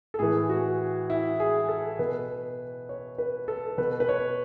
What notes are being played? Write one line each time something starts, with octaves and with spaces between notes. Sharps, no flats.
A4
A2 E3 G#4
F#4
E4
G#4
A4
B2 B4
C#5
B4
A4
B2 B4
B4
C#5